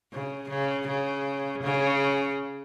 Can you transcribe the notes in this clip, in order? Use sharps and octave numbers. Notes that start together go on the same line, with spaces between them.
C#3
C#3
C#3
C#3